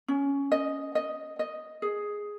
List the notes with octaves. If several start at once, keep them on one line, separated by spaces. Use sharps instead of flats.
C#4
D#5
D#5
D#5
G#4